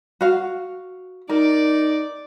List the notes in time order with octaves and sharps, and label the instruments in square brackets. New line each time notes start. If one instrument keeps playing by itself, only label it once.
[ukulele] F#4 F5
[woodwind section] D#4 [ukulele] A#4 [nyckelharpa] D5